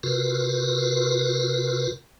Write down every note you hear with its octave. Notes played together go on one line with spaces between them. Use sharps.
C3 F4 F#4 A#4 B4